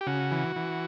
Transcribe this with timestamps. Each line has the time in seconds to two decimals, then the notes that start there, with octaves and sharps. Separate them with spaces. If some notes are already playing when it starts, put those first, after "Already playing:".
0.01 G4
0.07 C#3 F#4
0.32 E3
0.56 E3